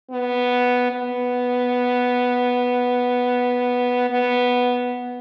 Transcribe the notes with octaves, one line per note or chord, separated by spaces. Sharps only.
B3
B3
B3